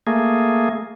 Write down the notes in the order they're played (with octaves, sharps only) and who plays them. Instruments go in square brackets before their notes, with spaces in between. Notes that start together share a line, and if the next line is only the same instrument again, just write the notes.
[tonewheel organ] A3 A#3 G#4